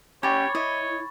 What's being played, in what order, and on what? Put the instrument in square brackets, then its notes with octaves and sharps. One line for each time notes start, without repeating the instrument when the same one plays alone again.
[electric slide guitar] C#4 G5 G#5 [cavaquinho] G4 [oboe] C#5 [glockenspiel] B5 C#6 A6
[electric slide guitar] E4 [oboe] C#5 [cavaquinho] D#5